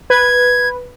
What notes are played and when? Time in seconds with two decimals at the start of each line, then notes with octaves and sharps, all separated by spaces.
0.10 B4 G#6